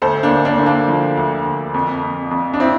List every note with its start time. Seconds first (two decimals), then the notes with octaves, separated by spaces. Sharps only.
0.02 D2 A4 C5
0.23 A#3 D4
0.31 D2
0.45 A#3 D4
0.59 D3
0.66 A#3 D4
0.88 F3
1.17 D2
1.45 D2
1.74 F2
2.03 F2
2.31 F2
2.54 D4
2.60 C4 E4